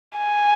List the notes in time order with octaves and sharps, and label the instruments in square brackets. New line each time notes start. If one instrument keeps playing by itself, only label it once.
[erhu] G#5